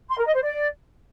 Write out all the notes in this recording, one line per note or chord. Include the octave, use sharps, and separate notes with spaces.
C6
A#4
D#5
C5
D5